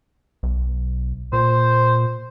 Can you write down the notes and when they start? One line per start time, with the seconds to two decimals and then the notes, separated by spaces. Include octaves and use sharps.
0.43 B1
1.33 A#2 C5